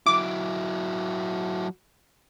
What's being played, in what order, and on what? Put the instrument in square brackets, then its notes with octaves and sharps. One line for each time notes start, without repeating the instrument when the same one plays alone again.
[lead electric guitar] F#3 E4 [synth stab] D6